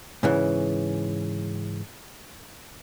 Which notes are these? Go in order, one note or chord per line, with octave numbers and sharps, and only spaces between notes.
G#2 C#3 E3